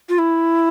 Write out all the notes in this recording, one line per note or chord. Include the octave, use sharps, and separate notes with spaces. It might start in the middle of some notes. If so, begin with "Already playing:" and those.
F4
E4